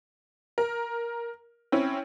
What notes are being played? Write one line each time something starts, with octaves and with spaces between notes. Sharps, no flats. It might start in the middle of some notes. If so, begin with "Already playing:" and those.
A#4
C4 C#4 E4